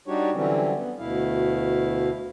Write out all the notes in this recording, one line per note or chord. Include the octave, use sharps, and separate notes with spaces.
G3 D4 D#4 F#4 G4 C#5
D3 E3 F#3 G3 C4 C#4
B3
D2 B2 E4 F5